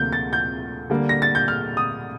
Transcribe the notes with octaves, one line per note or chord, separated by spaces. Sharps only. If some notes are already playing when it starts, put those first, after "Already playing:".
Already playing: D2 C3 F3 A#3 F4 G6
A6
G6
D3 G3 A#3
A#6
A6
G6
F6
D#6